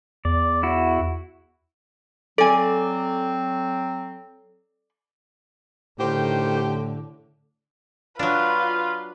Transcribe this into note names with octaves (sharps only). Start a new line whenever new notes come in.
E2 D5
E4 F#4
F#3 C4 A4 D5 G#5
A2 D3 D#3 F#4 G4 C5
F#3 D4 F4 B4